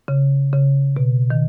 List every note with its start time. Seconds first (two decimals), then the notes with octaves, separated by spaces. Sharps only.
0.08 C#3
0.53 C#3
0.97 B2
1.30 D#3